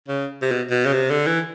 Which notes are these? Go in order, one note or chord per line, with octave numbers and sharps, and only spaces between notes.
C#3
C3
B2
B2
C#3
C3
D3
E3